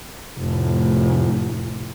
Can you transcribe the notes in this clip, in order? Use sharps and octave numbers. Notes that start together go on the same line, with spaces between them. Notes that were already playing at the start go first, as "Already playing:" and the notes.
F1 A2